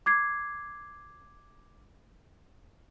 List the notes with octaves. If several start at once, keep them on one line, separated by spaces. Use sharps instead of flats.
D6 G#6 C7